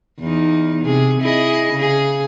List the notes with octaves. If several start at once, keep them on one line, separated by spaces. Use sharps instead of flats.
E2 D#4
C3 G#4
E4 G#4 D#5
C#3 G#4